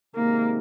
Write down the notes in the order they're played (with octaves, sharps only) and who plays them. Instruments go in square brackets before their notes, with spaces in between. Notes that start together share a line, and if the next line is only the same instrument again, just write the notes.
[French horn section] C3 D#3 G#3 D#4 [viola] A#3